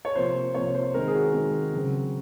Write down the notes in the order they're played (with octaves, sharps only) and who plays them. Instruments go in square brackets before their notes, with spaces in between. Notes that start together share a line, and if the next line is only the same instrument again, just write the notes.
[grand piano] C#5
C3 F3 A#3 C5
C3 F3 A#3 C#5
C5
D#3 G#3 C4 A#4
G#4
F#4
D#3 G#3 C4
C#3 F#3 C4